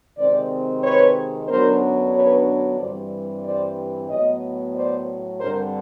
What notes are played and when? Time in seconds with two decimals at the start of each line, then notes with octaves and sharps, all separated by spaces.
0.18 C3 D#3 G#3 C4 C5 D5
0.83 B4 C#5
1.48 F#2 D3 F#3 B3 D4 A#4 C5
2.13 B4 C#5
2.79 G2 E3 G3 C4 C5 D5
3.44 C5 D5
4.09 A2 F#3 B3 C#5 D#5
4.75 C5 D5
5.40 G2 D3 G3 C4 A#4 C5